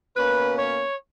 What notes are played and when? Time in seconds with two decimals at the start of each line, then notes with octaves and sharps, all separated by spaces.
0.16 B2 A#3 C#4 B4
0.58 C#5